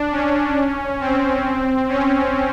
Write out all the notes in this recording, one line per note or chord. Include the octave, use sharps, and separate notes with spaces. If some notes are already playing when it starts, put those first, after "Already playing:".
Already playing: D4
C#4
C4
C#4